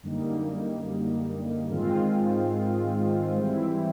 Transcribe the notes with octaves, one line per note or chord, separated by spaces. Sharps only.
F#2 D3 G3 A#3 D#4
G#2 D#3 G#3 C4 F4
E3 G3 C4 E4